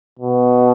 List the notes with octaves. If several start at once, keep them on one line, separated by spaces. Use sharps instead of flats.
B2